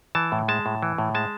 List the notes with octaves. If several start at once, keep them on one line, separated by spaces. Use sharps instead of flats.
E3 A5
A2
G#3 A5
A2
E3
A2
G#3 A5